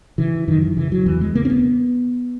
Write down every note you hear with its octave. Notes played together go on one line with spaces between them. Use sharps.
C#3 E3
F#2 D#3
E3
C#3 E3
F#3
E2 E3
G#3
C#3 A#3
C#4
B3